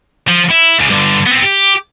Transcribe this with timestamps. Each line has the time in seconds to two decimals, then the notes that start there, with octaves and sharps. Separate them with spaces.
0.28 F3
0.50 E4
0.79 C#2 C#3
0.90 G2 D3
1.27 B3 C4
1.42 G4